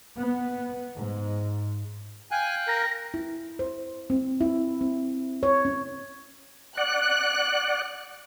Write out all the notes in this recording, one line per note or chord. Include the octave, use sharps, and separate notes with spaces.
B3
G#2
F5 G5 G#5 F#6
A#4 A#6
E4
C5
C4
E4
C4
C#5
C#4
D5 F#5 F#6